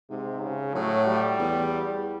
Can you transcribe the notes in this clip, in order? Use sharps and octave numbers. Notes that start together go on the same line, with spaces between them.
G#2 C3
C#3
A2 F#3
G3
E2